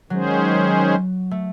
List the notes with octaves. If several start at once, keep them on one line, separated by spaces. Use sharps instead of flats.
D#3 F#3 G#3 C#4 G#4 C5
A3